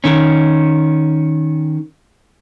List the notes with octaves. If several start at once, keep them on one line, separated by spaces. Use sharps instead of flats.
D#3 C#4